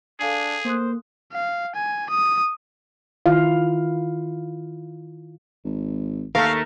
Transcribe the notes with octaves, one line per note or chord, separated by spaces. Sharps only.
D4 G#4 A4 F5 G#5
A#3 C5 C6 D#6 F#6
F5
G#5
D#6
D#3 E4 F4 F5
G#1
D#2 A3 A#4 F5